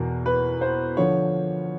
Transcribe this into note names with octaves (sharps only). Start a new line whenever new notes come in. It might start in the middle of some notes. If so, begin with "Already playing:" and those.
Already playing: E2 B2 A#4
B4
C5
D3 F3 C#5